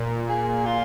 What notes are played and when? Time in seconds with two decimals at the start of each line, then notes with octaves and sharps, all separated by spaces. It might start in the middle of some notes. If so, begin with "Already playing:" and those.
Already playing: A#2
0.29 G#4
0.66 F4